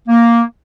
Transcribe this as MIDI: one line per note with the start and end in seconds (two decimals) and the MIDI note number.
0.08 0.42 58